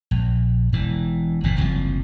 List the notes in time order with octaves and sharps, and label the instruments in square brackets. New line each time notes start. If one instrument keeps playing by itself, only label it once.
[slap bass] A#1
E1 E3
F#1 A#2
F#1 C2 B2 F3